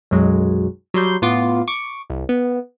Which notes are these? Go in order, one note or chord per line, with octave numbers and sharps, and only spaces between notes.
B1 F#2 F#3 G#3
F#3 G3 C6 G6
A2 B3 F4 D6
C#6 D6
C2
B3